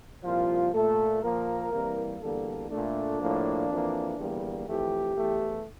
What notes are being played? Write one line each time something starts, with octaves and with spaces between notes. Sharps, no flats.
C2 A#2 F3 F4
A#2 A3 A4
A#2 F3 A#3 A#4
C2 C3 E3 G3 A#3
E2 D3 G3 A#3 A4
A#2 A3 D4
A2 F3 A#3
F2 E3 A#3
E2 D3 G3 A#3
F2 E3 A3 G4
E2 E3 A3